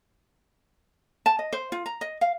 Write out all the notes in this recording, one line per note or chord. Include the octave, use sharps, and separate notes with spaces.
A5
D#5
C5
F4
A#5
D#5
F5